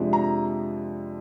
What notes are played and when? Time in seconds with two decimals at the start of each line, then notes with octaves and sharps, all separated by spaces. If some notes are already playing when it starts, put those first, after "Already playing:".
Already playing: F2 C3 F3 G#3 D4
0.13 A#5